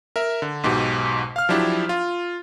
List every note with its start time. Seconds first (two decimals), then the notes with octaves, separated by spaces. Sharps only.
0.16 A#4 E5
0.42 D3
0.63 B1 G#2 B2 G4
1.36 F5 F6
1.49 F3 F#3 D4 E4 G4
1.89 F4